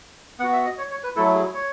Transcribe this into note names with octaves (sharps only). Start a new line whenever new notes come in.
B3 F#4 F#5
E5
D#5
C#5
C#5
B4
F#3 A3 E4 A4
G#4
C#5